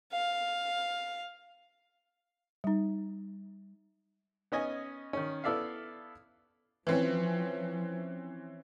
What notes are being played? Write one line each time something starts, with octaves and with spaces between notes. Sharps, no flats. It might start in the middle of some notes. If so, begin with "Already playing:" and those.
F5
G3 D#4
B3 C#4 D#5 G#5
D#3 C#4
B3 E4 A4 D5 E5 F5
E3 F3 C4 C#4 B4